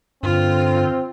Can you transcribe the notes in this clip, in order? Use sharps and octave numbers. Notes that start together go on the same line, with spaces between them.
G2 D3 C4 F4